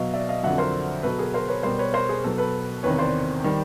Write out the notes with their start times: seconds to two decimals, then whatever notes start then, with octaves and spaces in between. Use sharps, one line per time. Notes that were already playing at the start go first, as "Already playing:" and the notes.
Already playing: B2 F#3 D#5 F5
0.14 D5 E5
0.29 D#5 F5
0.43 F2 D3 F#3 E5 F#5
0.58 A#4 C5
1.03 B2 F#3 A4 B4
1.18 G#4 A#4
1.34 A#4 C5
1.48 B4 C#5
1.63 B2 G3 A#4 C5
1.79 B4 C#5
1.93 A#4 C5
2.09 G#4
2.24 B2 F#3 A4
2.38 A4 B4
2.83 E2 C3 D#3 B4 C#5
2.98 C5 D5
3.44 D#3 G3